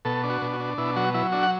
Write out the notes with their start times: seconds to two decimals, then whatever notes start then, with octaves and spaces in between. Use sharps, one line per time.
0.05 B2 A4
0.24 D4
0.30 F#4
0.42 B2
0.53 F#4
0.60 D4
0.78 B2 E4
0.96 F#3 F#4
1.14 F#3 E4
1.32 D4 F#4
1.43 F#5